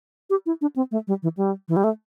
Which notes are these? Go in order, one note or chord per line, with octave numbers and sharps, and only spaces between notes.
G4
E4
D4
C4
A3
G3
E3
G3
E3
G3
A3